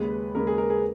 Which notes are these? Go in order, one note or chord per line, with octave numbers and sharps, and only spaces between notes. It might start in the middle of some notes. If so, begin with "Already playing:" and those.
Already playing: D#2 C#3 G#3 B4
D#2 C#3 G#3 A#4
G#4
A#4
G#4